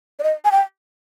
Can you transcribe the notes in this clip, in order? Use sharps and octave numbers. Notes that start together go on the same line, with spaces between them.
D5
D#5
G#5
G5